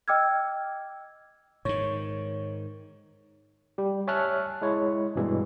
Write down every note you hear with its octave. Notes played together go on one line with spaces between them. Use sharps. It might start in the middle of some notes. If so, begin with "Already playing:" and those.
D#5 G5 D6 E6 F6 G#6
G#2 D#3 C#5
G3 G4
C#5 E5 G#5 A5 F6 F#6
G#3 E4 C#5
G2 B2 E3 G3 G#3